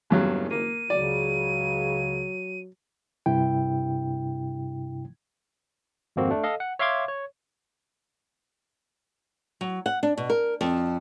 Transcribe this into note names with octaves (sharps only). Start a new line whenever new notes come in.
F#1 E2 G2 F#3
A#3 D#7
C#2 C#3 F#3 D5
G2 C3 E4 G5
G#1 F2 A#3 C4 F#4
A3 D4
A4 D#5 F5
F#5
C#5 E5 F5 C6 D6 G#6
C#5
F#3
F#5
D4
B2
A#4
F2